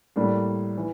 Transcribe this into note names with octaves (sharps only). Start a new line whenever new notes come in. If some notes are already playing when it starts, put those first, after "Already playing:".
A2 G3 A#3 D4
E3